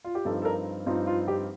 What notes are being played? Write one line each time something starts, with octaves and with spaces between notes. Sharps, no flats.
F4
G4
G2 F3 C4 D#4 A4
A4
A#4
G2 F3 C4 D#4 F4
F4
G4